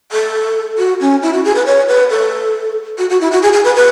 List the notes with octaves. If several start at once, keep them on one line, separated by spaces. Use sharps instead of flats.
A4
F#4
C#4
E4
F#4
G#4
B4
C#5
B4
A4
F#4
F#4
E4
F#4
G#4
G#4
B4
B4